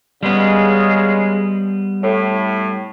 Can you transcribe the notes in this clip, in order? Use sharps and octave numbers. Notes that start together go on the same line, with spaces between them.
C#3 G3 G#3 B3
A2